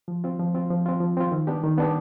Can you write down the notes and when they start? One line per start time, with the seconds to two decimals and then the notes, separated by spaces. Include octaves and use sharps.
0.08 F3
0.24 C4 F4
0.39 F3
0.54 C4 F4
0.70 F3
0.86 C4 F4
1.00 F3
1.17 C4 F4
1.32 D#3
1.47 B3 D4 G4
1.63 D#3
1.78 B3 D4 G4